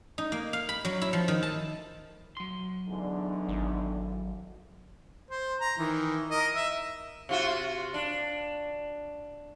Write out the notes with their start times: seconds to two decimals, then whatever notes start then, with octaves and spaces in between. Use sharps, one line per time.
0.18 D#4
0.32 A#3
0.53 F5
0.69 B5
0.85 F#3
1.02 E4
1.13 F3
1.28 D#3
1.43 A5
2.37 F#3 C6
2.88 E2 G#2 D3
3.49 G#1
5.31 C5
5.60 A#5
5.77 D#3 E3
6.31 A#4 D#5
6.56 E5
7.29 C3 F4 F#4
7.94 D4